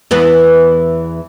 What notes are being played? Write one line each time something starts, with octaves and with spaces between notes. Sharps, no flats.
E2 E3 B3